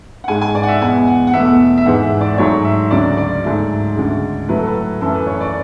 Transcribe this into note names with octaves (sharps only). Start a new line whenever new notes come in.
F#5
G#2 G#3 G#5
G#5
D5
F#5
E5
E2 B2 G#3 G#5
F#5
F#5
E2 B2 A3 E5
E5
G#2 E3 G#3 F#5
E5
D5
G#2 F#3 A3 C#5
E5
D2 C#3 F#3 D5
D5
G#2 F#3 A3
D2 C#3 G#3
A2 F#3 A3 B4
A4
B4
F#2 E3 A3 A4
B4
C#5
D5